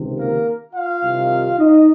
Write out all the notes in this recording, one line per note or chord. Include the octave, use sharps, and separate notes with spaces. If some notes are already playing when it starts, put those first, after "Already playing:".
Already playing: C#2 C3 D#3
A#3 A#4
F4 F5
C2 C3 D#3
D#4 D#5